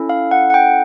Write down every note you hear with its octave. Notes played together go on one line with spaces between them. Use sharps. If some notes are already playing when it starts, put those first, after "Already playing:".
Already playing: C#4 E4 A4
F5
F#5
F#5
G5